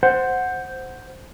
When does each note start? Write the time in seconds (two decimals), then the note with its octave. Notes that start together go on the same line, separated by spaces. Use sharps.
0.03 C5 F#5